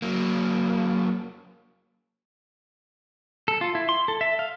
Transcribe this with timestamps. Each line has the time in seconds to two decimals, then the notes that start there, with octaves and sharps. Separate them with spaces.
0.02 F#3 A#3
3.48 A4
3.61 F4
3.75 E4
3.89 C6
4.08 A4
4.21 E5
4.39 F5